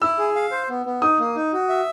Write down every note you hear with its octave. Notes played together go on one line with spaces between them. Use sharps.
E4 E6
G#4
F5
C5
B3
B3
D#4 D#6
A#3
D#4
F#4
E5